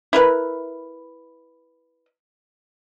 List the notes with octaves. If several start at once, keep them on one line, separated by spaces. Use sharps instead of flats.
E4 A#4 B4